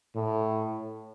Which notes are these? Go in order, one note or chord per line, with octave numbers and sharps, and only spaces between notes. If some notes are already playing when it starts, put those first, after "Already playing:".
A2